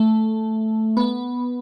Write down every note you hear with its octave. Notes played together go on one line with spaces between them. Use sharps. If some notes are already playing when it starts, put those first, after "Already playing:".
Already playing: A3
B3